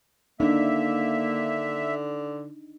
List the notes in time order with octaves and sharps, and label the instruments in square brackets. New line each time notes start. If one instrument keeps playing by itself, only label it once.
[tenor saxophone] D3 [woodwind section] A#3 [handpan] D4 D#4 [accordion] E5